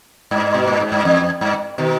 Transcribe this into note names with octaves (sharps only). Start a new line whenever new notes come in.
G2
B2
A#2
G#2
G2
E2
G2
B2 D#3